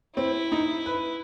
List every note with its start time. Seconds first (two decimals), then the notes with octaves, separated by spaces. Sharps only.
0.17 C4 E4
0.52 D#4
0.86 B4